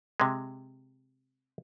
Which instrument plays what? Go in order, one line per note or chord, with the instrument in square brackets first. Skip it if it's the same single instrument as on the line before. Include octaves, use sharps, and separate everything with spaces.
[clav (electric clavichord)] C3 G#3